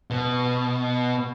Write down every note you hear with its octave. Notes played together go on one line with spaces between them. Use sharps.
B2